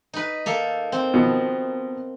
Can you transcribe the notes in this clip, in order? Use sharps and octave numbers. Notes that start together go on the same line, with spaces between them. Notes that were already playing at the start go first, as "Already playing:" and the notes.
D#4 B4
A#3 A4
C4
B2 D#3 F3